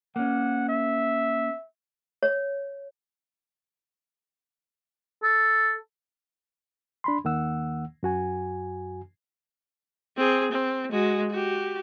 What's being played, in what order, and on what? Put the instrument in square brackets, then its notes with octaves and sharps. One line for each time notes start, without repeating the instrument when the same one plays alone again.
[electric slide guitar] A#3 C#4 [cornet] F#5
[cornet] E5
[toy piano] C#5
[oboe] A4
[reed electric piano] D4 B5 C6
D#2 D#3 A#3 F#5 E6
F#2 F#4 G#5
[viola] C4 G#4
C4
G#3 F#4
F#4 G4